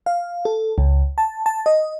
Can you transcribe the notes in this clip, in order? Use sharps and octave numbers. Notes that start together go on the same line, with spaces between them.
F5
A4
C#2
A5
A5
D#5